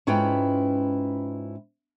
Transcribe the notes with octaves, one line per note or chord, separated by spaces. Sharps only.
G#2 C#4 E4 F4 B4 G5